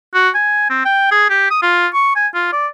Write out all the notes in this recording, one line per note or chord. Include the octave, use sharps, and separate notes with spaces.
F#4
G#5
C4
G5
G#4
G4
D#6
F4
C#6
G#5
F4
D5